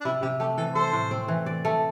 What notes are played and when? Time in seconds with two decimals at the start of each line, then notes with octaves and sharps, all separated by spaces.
0.01 D4
0.05 C3 E4
0.22 C3 G4
0.40 A3 G4
0.57 E3 A4
0.75 A4 C5
0.93 A2
1.11 C4
1.28 E3
1.46 D5
1.65 A3